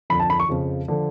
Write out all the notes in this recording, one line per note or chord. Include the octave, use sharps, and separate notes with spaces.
F2 D3 F3 B5
A5
B5
C#6
F2 C#3 F3
D3 F3